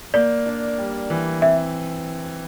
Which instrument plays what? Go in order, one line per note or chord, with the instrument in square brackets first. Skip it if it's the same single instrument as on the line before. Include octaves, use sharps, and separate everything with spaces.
[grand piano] A#3 [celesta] D5
[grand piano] D4
G3
E3
[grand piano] C4 [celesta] E5